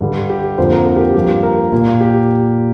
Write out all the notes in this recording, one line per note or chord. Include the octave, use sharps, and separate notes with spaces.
G2 D3 G3
G4
F2 D3 A#3 C5
A#4
A#4
G4
G2 F3 A#3 G4
A#4
A#2 A#3
G4